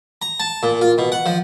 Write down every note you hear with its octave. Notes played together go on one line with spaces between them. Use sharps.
A#5
A5
A#2
F4
B2
F#5
F3